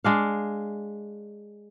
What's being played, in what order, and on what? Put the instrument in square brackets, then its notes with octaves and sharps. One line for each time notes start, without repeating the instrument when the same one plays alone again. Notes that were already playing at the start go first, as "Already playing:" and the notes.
[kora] G#3 D4 F5